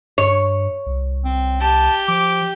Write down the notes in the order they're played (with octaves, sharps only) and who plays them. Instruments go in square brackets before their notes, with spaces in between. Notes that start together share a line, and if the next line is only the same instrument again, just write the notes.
[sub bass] G2 [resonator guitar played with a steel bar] C#5
[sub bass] C2
[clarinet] C4
[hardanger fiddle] G4 [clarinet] A5
[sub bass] F3 [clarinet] D6